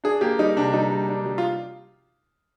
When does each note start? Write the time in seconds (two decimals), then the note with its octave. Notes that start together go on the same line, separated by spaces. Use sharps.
0.04 D4 G#4
0.21 A#3 G4
0.39 G3 D#4
0.56 C3 D4
0.73 G3 D#4
0.92 G3
1.09 D4
1.26 G3
1.38 F4